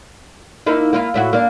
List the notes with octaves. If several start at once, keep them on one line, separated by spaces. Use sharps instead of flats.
A#3 D#4 E4
A#3 E4 F4
A2 E4 F#4
A#3 D4